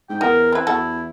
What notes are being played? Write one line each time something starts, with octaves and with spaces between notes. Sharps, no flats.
G#2 G5
E2 B3 A#4
C4 E4 B4
E2 F#4 A4